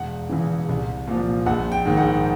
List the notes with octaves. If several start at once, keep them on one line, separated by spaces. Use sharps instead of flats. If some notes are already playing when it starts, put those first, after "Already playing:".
Already playing: E1 F#5
E2 C#3 E3
C2
A#2 F3
A#1 F#5
G5
G#2 D#3
F#5